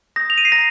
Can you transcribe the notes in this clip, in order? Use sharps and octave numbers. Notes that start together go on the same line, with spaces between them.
D#6 G6 A#6
F7
D#7
C7
A#5 A#6